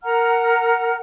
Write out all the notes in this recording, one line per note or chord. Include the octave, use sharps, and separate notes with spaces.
A#4 F#5 A#5 F6